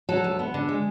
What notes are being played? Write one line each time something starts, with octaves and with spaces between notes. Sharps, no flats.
F#3 A4
D2
B3
D3
G#3